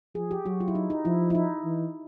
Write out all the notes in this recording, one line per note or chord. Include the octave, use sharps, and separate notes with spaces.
F3 G#4
G4
F#3 F#4
F4
E4
D#4
D#4
F3 E4
E4
D#4
E3